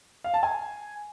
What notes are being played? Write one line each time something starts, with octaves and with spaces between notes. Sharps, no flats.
F5
A5
G#5